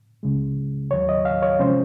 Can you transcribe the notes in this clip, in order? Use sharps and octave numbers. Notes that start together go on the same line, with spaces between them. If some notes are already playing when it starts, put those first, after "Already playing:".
C#2 C#3 G#3
D#2 D#3 F#3 C#5
D#5
F5
C#5
C3 F3 G#3 C#4 C5